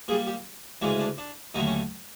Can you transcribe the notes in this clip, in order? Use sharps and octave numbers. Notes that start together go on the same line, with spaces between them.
A#2 G3 G#4
G4
D2 C#3 E3 G#3 D4
D4
D4
D#2 D3 F#3 A3 D#4
C#4